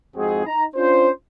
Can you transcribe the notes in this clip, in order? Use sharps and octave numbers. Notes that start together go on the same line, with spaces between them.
F2 G#2 G#3 C4 F#4 G#4
D#4 A#5
C#4 D4 F4 C5